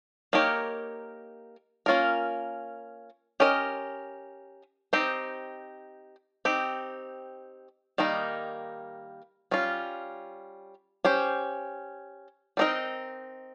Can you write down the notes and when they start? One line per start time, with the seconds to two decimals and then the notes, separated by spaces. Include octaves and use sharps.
0.33 A#3 D#4 G4 A#4 C#5
1.86 A#3 C#4 F4 A#4
3.40 C#4 G4 A#4 D#5
4.93 C4 D#4 G4 C5
6.45 C4 D#4 G4
7.98 D#3 G3 A#3 D#4
9.51 G3 C#4 F4
11.05 C#4 G4 C5
12.57 G3 C4 D#4 A#4 D#5